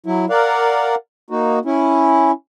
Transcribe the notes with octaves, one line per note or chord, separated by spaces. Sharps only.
F#3 E4
A#4 D5 F5 F#5
A#3 D#4 F#4
C#4 E4